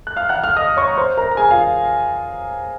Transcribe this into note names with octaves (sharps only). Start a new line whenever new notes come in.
F#6
F5 F6
F#5 F#6
F5 F6
D#5 D#6
C#5 C#6
A#5
C5 C6
A#4 A#5
A#5
G#4 G#5
F4 F5